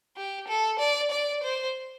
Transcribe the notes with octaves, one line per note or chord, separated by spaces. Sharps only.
G4
A4
D5
D5
C5